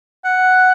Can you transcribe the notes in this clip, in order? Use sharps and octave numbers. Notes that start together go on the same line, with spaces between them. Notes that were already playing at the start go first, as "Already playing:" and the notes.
F#5